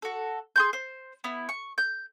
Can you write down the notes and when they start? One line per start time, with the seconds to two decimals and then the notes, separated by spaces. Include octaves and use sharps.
0.02 F#4 A4
0.56 G#4 C6 G6
0.73 C5
1.24 B3 E4
1.49 C#6
1.78 G6